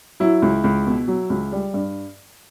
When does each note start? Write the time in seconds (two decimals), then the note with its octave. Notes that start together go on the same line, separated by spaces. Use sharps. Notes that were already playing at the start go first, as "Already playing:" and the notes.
0.20 F#3 E4
0.42 C#2
0.64 C#2
0.87 B2
1.08 F#3
1.30 C#2
1.52 G3
1.74 G2